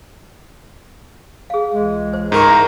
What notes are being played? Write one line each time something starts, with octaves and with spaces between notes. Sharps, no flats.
G#4 F5
C#2 E3 G#3
C5
G#2 A#4 A#5 C#6
E4 E5